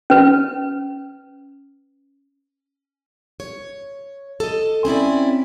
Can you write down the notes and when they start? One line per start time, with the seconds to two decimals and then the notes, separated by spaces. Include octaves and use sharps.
0.10 C#4 B4
3.40 C#5
4.40 A4 D#5
4.85 C4 C#4 E4 D5